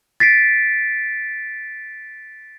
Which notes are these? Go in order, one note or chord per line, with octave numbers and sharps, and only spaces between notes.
A6 B6 C7 D7